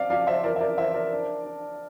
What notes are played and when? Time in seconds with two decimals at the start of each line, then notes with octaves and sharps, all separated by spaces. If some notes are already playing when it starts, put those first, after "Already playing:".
Already playing: C4 D5 F5
0.10 F3 D5 F5
0.27 C5 E5
0.44 E3 A#4 D5
0.56 E5
0.61 A#4 D5
0.78 E3 C5 E5
0.94 A#4 D5
1.12 D4
1.45 D4